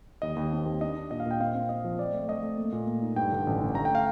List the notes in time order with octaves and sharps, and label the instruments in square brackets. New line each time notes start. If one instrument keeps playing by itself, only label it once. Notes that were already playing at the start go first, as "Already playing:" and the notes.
[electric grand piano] D#2 D#5
D#2
C4
D#2
D4 D#5
D4
A#2 D#5
F5
A#2
G5
C4 F5
C4
C4 D#5
F3
C4 D5
A3
A3 D#5
A3
A#3
A#2
A#3
D#4
G2 G5
D3
A1
D3
A3 A#5
G5
F5